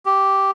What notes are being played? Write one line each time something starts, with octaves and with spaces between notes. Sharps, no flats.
G4